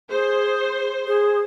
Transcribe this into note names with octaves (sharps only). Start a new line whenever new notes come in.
G#4 C5
G#4